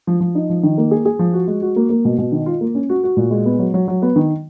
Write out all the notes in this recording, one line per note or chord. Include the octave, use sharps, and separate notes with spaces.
F3
F3
D#4
F3
D#3
A#3
G#4
G#4
F3
F#4
G#3
F#4
A#3
A#3
B2
B2
D#3
F4
A#3
C#4
F#4
F#4
A#2
G#3
B3
F#3
F#3
F#3
B3
D#3